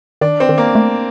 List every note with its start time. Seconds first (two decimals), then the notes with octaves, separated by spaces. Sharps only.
0.21 D#3 D4
0.40 C4
0.49 D#3
0.58 A#3
0.75 A3